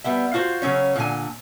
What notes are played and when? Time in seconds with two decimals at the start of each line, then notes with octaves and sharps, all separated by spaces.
0.04 G3 B3 E5
0.34 F4 F#4 C5
0.62 C#3 F#3 C#4 C#5
0.95 A#2 D3 G#5